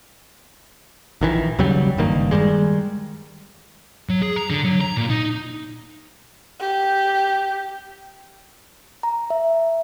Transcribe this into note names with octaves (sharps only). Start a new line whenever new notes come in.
A#1 D#3 E3
D#2 C#3 F#3 G3
F#1 G2 D#3 A#3
D#3 E3 G3 G#3
F#3
G#4
A#5
D3
F#3
A#5
A#2
D#4
G4
A#5
E5